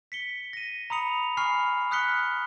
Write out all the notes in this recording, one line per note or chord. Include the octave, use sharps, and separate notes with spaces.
B6 C#7 G7
A#6 D#7
A#5 B5 D#6 C#7 F7
G#5 B5 C#6 F6 C7 F7
D#6 F6 F#6 B6 C#7 G7